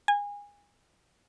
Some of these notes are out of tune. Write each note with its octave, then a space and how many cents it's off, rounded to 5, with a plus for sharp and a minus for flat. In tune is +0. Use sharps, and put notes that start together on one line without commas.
G#5 -25